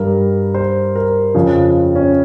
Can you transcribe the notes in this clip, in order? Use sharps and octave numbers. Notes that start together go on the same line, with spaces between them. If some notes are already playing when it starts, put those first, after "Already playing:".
Already playing: G2 G3 A#4
C5
A#4
F2 C#3 F3
C#4